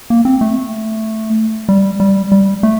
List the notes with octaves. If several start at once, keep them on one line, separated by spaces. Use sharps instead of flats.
A#3
C4
A3
G3
G3
G3
A3